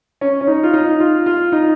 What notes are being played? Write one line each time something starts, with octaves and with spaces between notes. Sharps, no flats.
C#4
C#4
D#4
F4
D#4
F4
F4
D#4